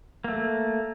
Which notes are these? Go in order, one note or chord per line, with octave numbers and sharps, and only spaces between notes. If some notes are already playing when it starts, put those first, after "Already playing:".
A3 A#3